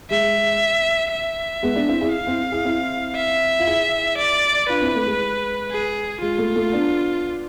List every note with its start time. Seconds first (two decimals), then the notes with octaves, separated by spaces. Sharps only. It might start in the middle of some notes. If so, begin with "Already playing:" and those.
0.10 G#3 E5
1.12 E5
1.63 G#3 B3
1.75 B3 D4
1.88 C4 E4
2.01 E4 G#4
2.14 F5
2.26 C4 E4
2.52 E4 G#4
2.64 C4 E4
3.16 E5
3.59 F4
3.66 E4 G#4
4.18 D5
4.69 D4 F4 B4
4.82 C4 E4
4.95 A3
5.07 G#3
5.71 G#4
6.21 G#3 F4
6.38 A3
6.56 A3
6.73 B3 D4